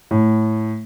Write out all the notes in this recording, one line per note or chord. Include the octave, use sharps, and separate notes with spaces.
A2